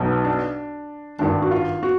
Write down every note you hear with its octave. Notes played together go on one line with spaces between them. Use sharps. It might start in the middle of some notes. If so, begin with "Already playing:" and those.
Already playing: B1 B2 D#4
D4
G#1 G2 D#3 D4
F#4
F4
F#4